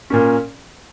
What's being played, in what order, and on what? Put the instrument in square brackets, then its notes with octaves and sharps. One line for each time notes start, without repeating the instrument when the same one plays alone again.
[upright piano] A#2 A#3 C#4